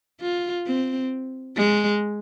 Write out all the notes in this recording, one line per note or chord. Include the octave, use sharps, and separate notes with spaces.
F4
C4
G#3